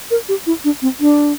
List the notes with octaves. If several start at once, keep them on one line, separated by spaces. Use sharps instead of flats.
A#4
G4
E4
D4
C4
D4